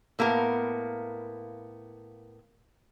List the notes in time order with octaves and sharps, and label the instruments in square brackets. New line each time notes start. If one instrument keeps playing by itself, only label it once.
[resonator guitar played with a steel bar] A2 A#3 B3 A#4 F5